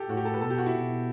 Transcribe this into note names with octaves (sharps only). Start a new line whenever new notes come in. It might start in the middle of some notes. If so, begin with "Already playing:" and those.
Already playing: G4 A4
A2 F#4
G4
A4
B4
B2 A4
G4
F#4
E4
B2